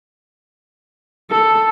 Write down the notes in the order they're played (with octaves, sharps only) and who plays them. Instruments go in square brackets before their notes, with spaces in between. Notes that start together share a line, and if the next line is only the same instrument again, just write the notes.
[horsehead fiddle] A4